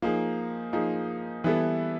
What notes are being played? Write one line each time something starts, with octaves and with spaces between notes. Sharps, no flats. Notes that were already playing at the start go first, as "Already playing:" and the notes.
F3 A#3 D#4 G#4
F3 A#3 D#4 G#4
E3 G3 B3 E4 A4